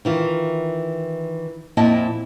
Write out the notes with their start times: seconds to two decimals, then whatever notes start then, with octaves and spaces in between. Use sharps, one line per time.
0.05 D#3 E3 F4
1.77 F2 A#2 E4 D#5 G5 A5